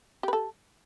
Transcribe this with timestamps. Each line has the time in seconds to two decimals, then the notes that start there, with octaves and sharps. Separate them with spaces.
0.23 G4
0.28 B4
0.33 A4